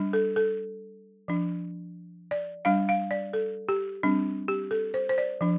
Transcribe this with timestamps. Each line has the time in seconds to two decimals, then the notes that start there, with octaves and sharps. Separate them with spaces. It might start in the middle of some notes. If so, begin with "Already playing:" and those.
Already playing: G3 D4
0.13 A4
0.36 A4
1.28 F3 D4
2.31 D5
2.65 G3 D4 F5
2.89 F5
3.11 D5
3.33 A4
3.69 G4
4.03 G3 C4 D4
4.48 G4
4.71 A4
4.94 C5
5.09 C5
5.18 D5
5.41 F3 D4